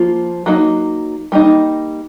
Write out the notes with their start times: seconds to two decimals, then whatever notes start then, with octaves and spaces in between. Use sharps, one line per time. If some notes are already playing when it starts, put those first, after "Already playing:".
Already playing: F3 A#3 F4
0.46 F#3 A#3 D#4
1.32 G3 A#3 D#4